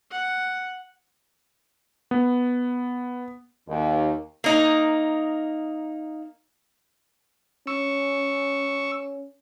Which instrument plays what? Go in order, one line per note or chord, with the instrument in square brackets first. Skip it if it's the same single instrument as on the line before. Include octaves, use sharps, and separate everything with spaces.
[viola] F#5
[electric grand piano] B3
[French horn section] D#2
[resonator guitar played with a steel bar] A#3 D#4
[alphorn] C#4 [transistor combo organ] C#6 E6